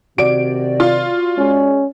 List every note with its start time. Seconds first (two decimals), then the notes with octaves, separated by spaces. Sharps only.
0.18 C3 D#3 F#4 D5 D7
0.80 F4
1.38 G#3 C#4